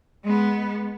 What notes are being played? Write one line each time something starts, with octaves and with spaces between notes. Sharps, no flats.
G#3 B3